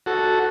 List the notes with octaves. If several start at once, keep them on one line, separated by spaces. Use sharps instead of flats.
F#4 A4